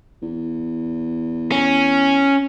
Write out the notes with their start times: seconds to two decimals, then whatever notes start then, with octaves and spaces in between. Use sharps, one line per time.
0.22 E2
1.52 C#4